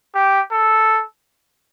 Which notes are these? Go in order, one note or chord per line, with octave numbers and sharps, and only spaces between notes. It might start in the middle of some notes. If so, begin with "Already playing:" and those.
G4
A4